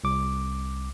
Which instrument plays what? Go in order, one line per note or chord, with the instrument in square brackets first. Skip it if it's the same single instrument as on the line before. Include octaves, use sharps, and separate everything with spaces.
[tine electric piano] C2 D6